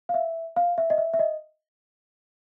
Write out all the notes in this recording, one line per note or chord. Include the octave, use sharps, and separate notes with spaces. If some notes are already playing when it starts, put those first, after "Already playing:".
F5
E5
F5
E5
D#5
E5
E5
D#5